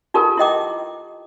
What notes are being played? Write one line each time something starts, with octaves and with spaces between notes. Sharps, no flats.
D#4 F4 G4 A4 A#4 G#5
E4 G4 D#5 G5 D6